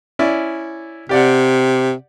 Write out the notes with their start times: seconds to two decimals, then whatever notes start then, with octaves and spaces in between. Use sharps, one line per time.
0.19 C#4 E4 D5
1.09 C3 G4 D5 F#5